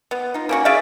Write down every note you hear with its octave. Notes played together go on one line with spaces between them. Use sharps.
B3
D#4 F4
A#3 C#4 F#4
G#4 D5 E5 F5